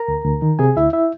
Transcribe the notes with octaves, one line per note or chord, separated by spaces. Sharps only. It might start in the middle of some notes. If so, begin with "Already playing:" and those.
Already playing: A#4 A#5
D2
D2
D#3
C3 G#4 G#5
D2 E4 E5
E4 E5